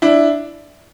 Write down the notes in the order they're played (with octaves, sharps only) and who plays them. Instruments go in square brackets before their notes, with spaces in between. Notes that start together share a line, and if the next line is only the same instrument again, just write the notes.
[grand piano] D4 E4